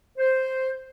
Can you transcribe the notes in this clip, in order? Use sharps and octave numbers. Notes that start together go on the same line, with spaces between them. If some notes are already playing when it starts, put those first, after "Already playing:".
C5